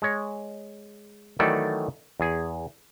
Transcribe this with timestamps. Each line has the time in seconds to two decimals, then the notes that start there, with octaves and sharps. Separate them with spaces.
0.02 G#3 C#5
1.39 D#3 E3 F#3 A3 A4 D5
2.20 E2 G#4